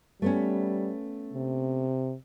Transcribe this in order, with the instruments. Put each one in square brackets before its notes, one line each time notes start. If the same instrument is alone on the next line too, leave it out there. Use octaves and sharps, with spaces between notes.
[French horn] G3 [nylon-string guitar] A3 B3 C#4
[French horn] C3